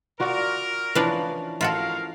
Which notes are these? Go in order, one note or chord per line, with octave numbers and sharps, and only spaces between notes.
F4 F#4 A#4 D5
E3 F3 C#4 D4 B4 F5
F4 F#4 A4 A#4 F5